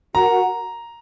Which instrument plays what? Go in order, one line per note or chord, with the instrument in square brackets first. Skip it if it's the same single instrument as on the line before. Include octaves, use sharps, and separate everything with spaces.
[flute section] F#4 A#4 F#5 [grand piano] A#5